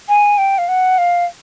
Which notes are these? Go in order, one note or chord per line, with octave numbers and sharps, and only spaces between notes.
G#5
G5
F5
F#5
F5